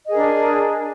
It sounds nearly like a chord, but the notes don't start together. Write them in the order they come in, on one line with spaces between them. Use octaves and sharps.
D#5 G#4 A#4 D4